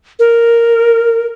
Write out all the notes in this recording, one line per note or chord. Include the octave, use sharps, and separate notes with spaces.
A#4